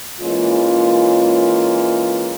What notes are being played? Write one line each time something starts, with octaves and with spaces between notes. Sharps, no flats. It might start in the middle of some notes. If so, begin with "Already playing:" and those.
E3 G#3 A#3 C#4 F4